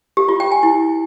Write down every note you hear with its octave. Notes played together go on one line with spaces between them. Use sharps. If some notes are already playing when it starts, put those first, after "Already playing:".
G4
F4
G5
G#5
E4